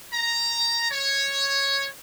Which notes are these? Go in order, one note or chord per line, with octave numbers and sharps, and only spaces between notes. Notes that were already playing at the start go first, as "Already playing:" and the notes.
A#5
C#5